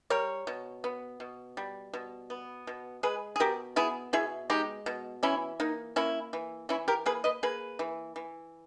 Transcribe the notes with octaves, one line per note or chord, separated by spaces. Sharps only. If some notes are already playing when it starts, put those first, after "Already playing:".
G3 A#4 C#5
B2
B3
B2
G3
B2
B3
B2
G#3 G#4 B4
G#4
B2 G4 A#4
B3 E4 G#4
B2 E4 G#4
G#3 D#4 G4
B2
E3 C#4 E4
A#3 D#4
A#3 C#4 E4
E3
E3 C#4 E4
G4 A#4
A#3 G#4 B4
B4 D#5
A#3 G#4 B4
E3
E3